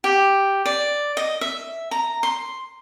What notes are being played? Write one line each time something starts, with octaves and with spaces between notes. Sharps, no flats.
G4
D5
D#5
E5
A#5
C6